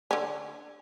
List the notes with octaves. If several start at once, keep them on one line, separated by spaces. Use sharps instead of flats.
D3 C#4